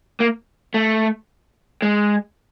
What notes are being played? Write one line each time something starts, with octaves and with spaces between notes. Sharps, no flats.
A#3
A3
G#3